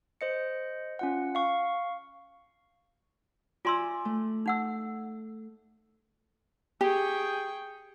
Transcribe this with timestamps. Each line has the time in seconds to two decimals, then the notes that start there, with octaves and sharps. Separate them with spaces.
0.21 C5 D#5 C#7
0.99 C#4 F4 F#5
1.35 F5 C#6
3.65 F4 D5 E5 G#5 C6 E6
4.05 A3
4.46 D#4 F#5 E6
6.81 G4 G#4 G5 C#6